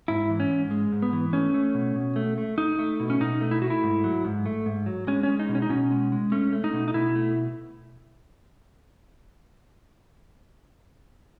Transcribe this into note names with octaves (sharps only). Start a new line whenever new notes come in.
G#2 E4
E3
C#4
G#2
G#3
G#2
B3
E3
A3 C#4
A3
B2
B2
A3
A3
A3 D#4
A3
B2
C#4
B2 D#4
A3
E4
A3 F#4
E4
G#2
F#3
G#2
A3
G#2
F#3
G#3 C#4
C#4
G#3
D#4
B2
C#4
D#4
B2 C#4
G#3
G#3
A3 C#4
A3
D#4
B2
D#4
B2 E4
A3